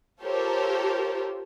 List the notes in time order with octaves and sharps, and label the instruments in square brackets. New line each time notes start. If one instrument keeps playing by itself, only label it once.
[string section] F4 G4 A4 A#4 C5 C#5